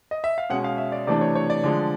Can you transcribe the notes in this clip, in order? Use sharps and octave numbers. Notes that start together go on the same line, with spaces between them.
D#5
E5
F5
B2 G#3 C#4 F#5
F5
E5
D5
C3 E3 A3 D4 D5
C#5
C#5
D5
D3 F3 G#3